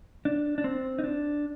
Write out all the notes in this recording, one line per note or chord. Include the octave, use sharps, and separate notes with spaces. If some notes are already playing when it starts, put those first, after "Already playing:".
D4
D4
C4
D#4
D4